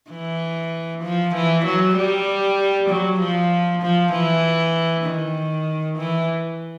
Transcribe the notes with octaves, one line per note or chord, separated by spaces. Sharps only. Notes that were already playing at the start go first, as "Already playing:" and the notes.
E3
F3
E3
F#3
G3
F#3
F3
F3
E3
D#3
E3